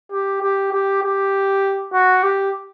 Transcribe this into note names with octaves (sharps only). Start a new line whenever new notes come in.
G4
G4
G4
G4
F#4
G4